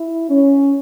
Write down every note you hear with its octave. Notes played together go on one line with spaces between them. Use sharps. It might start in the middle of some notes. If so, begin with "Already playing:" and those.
Already playing: E4
C#4